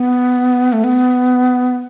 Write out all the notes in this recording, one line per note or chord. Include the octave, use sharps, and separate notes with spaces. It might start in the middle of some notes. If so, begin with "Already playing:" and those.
Already playing: B3
A3
B3